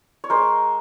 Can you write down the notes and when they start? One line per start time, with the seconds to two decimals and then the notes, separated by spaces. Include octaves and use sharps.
0.24 C#5
0.30 G#3 A#4 C5